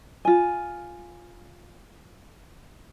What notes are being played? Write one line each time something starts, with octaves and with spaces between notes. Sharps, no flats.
F4 G#5